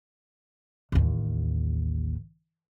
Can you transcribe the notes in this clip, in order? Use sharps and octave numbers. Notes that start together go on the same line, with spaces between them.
A1 D#2